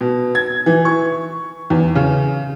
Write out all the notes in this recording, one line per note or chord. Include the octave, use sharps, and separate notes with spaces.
B2
G#6
E3
C#6
E2
C#3